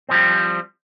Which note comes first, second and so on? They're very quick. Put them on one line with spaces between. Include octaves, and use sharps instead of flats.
C4 F3 G3